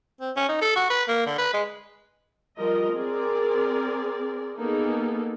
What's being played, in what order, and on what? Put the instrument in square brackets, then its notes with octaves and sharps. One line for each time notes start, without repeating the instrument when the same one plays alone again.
[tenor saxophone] C4
C#4
D#4
A4
F#4
B4
A#3
D3
B4
G#3
[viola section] F3 G3 A#4 D#5
C4 G#4 A#4 D5
A#3 B3 D#4 G#4 A4